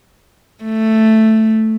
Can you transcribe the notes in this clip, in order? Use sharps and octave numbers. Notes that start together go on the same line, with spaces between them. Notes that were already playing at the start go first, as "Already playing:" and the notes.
A3